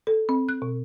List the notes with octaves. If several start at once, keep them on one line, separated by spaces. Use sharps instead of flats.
A4
C4
F#6
B2